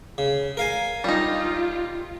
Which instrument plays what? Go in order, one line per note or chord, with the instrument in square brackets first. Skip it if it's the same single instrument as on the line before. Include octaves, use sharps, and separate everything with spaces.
[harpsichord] C#3
A#4 F5 G#5
[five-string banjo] G3 D#4 [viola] F4